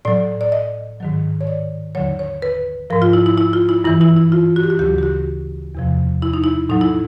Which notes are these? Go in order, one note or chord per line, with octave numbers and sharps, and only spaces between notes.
A2 F#3 D5
D5
D#5
G#2 D#3 F#3
C#5
D5
D#2 D3 F#3 C#5
C#5
B4
G#2 F3 A#4
F4
E4
E4
E4
F4
E4
G2 E3 E4
E4
E4
F4
F#4
G4
F#4
D2 C#3 F#3 G4
G4
F#4
E2 C3 F3
E4
D#4
E4
A2 F#3 D#4
E4